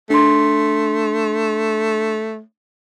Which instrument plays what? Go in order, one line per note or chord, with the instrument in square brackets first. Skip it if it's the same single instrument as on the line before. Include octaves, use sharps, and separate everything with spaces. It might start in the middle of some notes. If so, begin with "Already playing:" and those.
[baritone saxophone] A3 [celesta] D4 C6